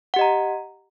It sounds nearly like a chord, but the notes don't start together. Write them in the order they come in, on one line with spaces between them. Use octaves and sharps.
F#5 G4 D#5 A#5